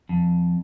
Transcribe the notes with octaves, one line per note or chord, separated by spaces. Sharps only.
F2